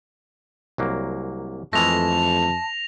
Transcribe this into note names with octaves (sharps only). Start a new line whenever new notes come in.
C2 F#3 A#3
F2 E3 G#3 A3 A5 A#6 F7